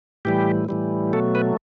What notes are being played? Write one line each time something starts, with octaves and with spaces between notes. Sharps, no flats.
A2 E3 G3 G4
A2 E3 G3
B2 F#3 A3 A4
B4